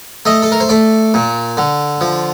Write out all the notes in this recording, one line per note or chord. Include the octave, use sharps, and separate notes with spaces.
A3 D#5
A4
A#4
C5
A3 D5
A#2
D3
F3